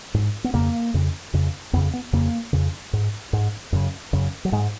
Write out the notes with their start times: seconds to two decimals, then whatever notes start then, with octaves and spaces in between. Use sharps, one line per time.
0.14 G#2
0.44 B3
0.54 F2 C#3 A#3
0.94 F2 C#3
1.34 F2 C#3
1.73 F2 B3
1.77 C#3
1.93 B3
2.13 F2 C#3 A#3
2.53 F2 C#3
2.93 G#2
3.33 G#2
3.72 F#2 C#3
4.13 F#2 C#3
4.45 F#3
4.52 G#2 G#3